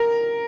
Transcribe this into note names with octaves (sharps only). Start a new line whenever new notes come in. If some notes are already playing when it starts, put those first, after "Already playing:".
Already playing: A#4